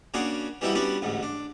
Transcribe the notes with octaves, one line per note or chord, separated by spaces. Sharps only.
C#3 A#3 C#4 D4 F#4 G#4
E3 G3 C4 D#4 E4 F#4
G3 B3 C#4 D4 F#4
A1 D2 G#2
D4